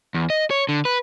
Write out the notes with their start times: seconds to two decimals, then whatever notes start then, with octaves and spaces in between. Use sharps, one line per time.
0.14 E2
0.30 D#5
0.51 C#5
0.69 D3
0.85 B4